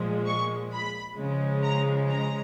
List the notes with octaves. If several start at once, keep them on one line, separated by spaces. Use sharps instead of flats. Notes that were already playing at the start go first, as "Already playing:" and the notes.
Already playing: A#2 F3 G#3
C#6
B5
C#3 F3 G#3
A#5
A#5